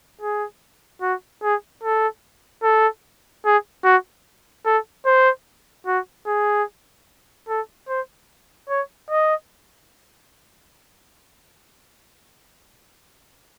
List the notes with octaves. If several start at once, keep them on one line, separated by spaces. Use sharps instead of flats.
G#4
F#4
G#4
A4
A4
G#4
F#4
A4
C5
F#4
G#4
A4
C5
C#5
D#5